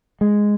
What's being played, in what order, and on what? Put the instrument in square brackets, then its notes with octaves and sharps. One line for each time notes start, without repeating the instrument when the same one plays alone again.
[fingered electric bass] G#3